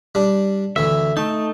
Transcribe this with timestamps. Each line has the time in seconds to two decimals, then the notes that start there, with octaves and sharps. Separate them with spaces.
0.15 G3 D4
0.76 D2 E3 E5
1.17 A3 D#4 A5